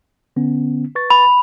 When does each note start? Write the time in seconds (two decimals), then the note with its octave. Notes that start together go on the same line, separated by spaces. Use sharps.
0.36 D3 B3 C#4
0.95 B4 C#6 A6
1.10 B5